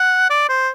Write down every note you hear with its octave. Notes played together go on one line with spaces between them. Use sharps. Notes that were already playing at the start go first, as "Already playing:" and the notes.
Already playing: F#5
D5
C5